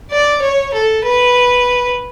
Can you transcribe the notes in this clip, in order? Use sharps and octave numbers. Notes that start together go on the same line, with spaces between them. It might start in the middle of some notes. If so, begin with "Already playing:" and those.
D5
C#5
A4
B4